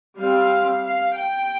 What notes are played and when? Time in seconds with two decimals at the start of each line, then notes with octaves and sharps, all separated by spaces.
0.18 G3 C4 F5
0.84 F5
1.17 G5